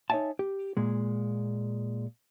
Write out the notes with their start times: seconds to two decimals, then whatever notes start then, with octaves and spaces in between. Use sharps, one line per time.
0.10 D#4 C#5 D5 E5 G#5 A5
0.39 G4
0.77 A#2 G#3